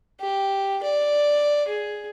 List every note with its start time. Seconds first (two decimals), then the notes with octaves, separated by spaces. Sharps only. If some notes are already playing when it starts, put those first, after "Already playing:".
0.20 G4
0.83 D5
1.68 G#4